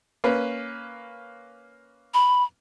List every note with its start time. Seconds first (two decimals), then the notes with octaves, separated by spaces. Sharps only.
0.24 A#3 C#4 B4
2.14 B5